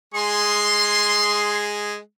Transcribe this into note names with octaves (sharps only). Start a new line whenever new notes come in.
G#3 G#4 C6